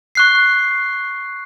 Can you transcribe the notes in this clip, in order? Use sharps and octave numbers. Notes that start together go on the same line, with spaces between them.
C#6 F#6 C7